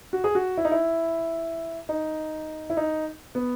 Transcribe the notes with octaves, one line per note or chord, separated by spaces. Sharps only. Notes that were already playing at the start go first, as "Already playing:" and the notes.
F#4
G#4
F#4
E4
D#4
E4
D#4
E4
D#4
B3